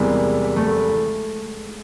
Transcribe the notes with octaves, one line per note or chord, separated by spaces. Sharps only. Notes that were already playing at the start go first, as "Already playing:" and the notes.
Already playing: E2 C3 E3 G3 G#3 A#3
A3